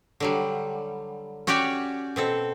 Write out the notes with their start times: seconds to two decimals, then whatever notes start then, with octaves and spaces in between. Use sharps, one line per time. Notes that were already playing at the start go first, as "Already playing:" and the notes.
0.20 D3 F#3 G3
1.47 C#4 F#4 G4 C#5 D5 G5
2.16 B2 C4 A4